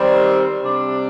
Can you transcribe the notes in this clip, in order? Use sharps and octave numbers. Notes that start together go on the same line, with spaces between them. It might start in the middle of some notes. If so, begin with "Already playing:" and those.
Already playing: D#3 G3 C4
C3 G3 D4